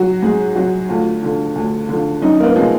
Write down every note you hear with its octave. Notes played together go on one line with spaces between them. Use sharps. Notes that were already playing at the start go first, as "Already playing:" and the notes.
Already playing: F#3 F#4
G#2 G#4
F#3 F#4
D2 F4
D3 F3
D2
D3 F3
F#2 D#4
A#3
B3
F3 G#3